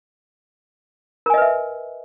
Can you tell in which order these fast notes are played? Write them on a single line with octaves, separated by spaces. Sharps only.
A#4 G#5 D#5 B4 E5